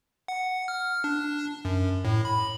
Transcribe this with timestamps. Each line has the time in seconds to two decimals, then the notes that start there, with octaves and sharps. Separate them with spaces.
0.28 F#5
0.68 F6
1.04 D4
1.65 F#2
2.05 A2
2.25 B5